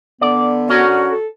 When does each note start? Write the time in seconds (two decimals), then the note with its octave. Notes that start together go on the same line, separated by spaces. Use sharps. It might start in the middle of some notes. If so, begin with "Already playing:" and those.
0.21 D3 B3 D5
0.69 C#4 F#4 A#4
1.11 A4